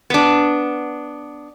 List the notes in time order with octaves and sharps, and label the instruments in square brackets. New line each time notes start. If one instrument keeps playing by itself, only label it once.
[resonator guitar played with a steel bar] B3 D4